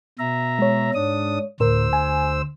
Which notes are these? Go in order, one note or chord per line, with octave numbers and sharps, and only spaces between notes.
B2 E5 A#5
G#3 C#5
G#2 D4 D#6
D2 A2 A#4 C5 E6
G#5